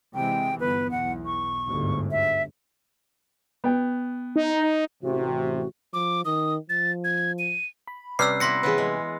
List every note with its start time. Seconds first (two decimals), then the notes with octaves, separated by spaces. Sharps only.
0.15 C3 E3 G#3 G5
0.60 G1 B3 B4
0.91 B1 E2 F#5
1.26 C#6
1.68 G1 D2 G#2
2.11 E5
3.64 B3 G5
4.36 D#4
5.03 A1 C3 F#4
5.93 F3 D6
6.25 D#3 D#6
6.69 F3 A6
7.04 G#6
7.39 D#7
7.87 B5
8.19 C3 G3 C#4 B4 D5 E6 F#6 C7
8.40 B3 E4 C6 A#6 C#7
8.63 E3 F#3 B3 G#4 B4
8.78 G#3